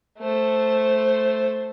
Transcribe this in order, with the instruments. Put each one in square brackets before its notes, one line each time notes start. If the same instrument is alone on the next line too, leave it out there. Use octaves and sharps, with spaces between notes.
[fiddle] A3 C5